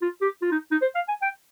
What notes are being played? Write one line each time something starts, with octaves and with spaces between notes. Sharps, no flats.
F4
G4
F4
D#4
D#4
C5
F5
G#5
G5